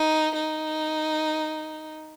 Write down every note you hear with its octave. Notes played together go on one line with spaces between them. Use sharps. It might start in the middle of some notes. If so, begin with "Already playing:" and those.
Already playing: D#4
D#4